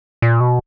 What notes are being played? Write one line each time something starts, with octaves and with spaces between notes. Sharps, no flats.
A#2
B2